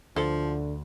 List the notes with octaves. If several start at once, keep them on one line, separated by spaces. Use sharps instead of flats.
D2 D3 F3 A4 C5